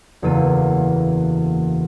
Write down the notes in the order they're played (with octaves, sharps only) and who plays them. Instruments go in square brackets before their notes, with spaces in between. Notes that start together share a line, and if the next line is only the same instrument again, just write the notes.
[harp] F#1 E2 A#3 A4 E6 D#7